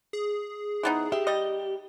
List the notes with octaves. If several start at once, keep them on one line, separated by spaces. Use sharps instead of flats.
G#4
E3 B3 D#4
G4 E5
G3 D#5